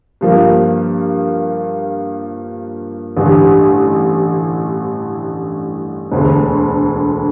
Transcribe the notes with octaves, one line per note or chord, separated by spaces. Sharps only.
G2 F3 A#3
A1 G2 D3 G3
E1 D2 D3